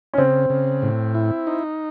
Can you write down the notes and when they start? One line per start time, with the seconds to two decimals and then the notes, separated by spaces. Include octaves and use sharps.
0.14 C#4
0.18 C#3 C4
0.50 C#3
0.82 A2
1.15 E4
1.47 D#4